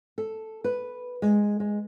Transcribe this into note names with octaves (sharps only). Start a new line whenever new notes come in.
A4
B4
G#3
G#3